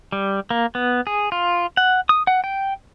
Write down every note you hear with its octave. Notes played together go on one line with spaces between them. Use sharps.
G3
A#3
B3
G#4
F4
F#5
D#6
F#5
G5